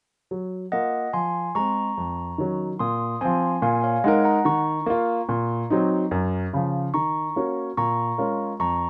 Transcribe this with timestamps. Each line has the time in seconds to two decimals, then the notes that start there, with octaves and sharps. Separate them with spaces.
0.31 F#3
0.72 A#3 F4 D#5 F#5
1.13 F3 G#5 C6
1.55 G#3 C4 A#5 C#6
1.97 F2
2.38 D#3 F#3 C#4
2.79 A#2 C6 D#6
3.21 F3 C4 G#5 C6
3.62 A#2 F5 G#5
3.84 C#5 F5
4.04 G#3 D#4 A#4 D#5 F#5
4.24 F#5 A#5
4.45 D#3 A#5 C#6
4.86 A#3 F4
5.29 A#2
5.70 F#3 C4 D#4
6.11 F#2
6.53 C#3 F3
6.94 D#3 A#5 C#6
7.36 A#3 C#4 F#4
7.77 A#2 A#5 C#6
8.18 G#3 C#4 F4 A#4
8.59 F2 A#5 C#6